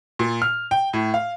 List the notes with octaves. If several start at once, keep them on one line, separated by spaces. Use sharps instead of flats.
A#2
F6
G5
A2
F5